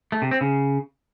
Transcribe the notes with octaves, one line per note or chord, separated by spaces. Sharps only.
A3
C3
C4
C#3